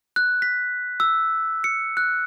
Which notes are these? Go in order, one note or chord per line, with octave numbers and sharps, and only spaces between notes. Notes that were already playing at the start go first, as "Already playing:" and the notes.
F#6
B6
E6
C#7
F#6